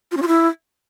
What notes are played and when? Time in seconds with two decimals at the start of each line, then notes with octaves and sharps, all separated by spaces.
0.12 F4
0.17 C#4
0.22 F4
0.28 E4